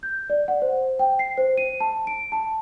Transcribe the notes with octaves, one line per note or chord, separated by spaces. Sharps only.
G6
D5
F#5
C5
G5
C7
C5
D#7
A5
D7
A5